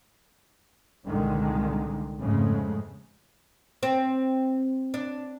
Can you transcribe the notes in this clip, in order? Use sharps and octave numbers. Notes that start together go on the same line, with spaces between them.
C2 A#2 D3 D#3 G#3
F2 G#2 C#3 G#3 A3
C4
D4